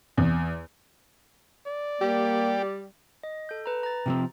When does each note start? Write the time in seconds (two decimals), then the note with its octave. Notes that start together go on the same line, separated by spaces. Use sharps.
0.18 E2
1.67 D5
2.01 G3 A#3 G4
3.23 D#5
3.49 A4 G6
3.66 B4 A#5
3.83 A#5 A6
4.06 C3 F3 C4